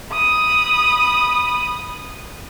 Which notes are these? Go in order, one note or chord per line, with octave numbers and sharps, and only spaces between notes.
B5 D#6